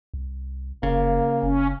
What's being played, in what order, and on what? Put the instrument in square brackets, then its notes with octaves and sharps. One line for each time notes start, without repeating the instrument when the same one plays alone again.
[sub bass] C2
[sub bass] F1 [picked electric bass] C#3 [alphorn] A#3
[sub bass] F#1 [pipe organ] C#4